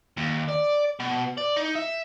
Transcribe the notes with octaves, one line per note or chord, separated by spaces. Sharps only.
D#2
D5
B2
D5
D#4
E5